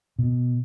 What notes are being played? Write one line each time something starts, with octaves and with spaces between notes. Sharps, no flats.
B2